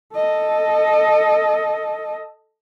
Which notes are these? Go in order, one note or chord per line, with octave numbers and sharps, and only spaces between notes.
A4 D#5